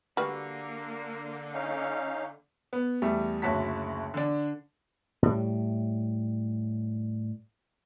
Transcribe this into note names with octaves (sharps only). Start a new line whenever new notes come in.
D3 G3 A#3 F#4 B4
C#4 D#4 F5
B3
E2 G3 A3
F#1 D2 F#4 C#5 A5 B6
D3 D4
A2 G3